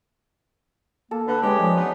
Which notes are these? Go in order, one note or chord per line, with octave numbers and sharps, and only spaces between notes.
A#3 A4
D3 B4
D3 G#3 C#4 G4 D#5 G#5
F3 D4 C#5 D6
B3 D#4